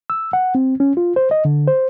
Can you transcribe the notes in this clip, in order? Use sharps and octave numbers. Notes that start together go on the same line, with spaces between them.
E6
F#5
C4
C#4
F4
C5
D#5
D3
C5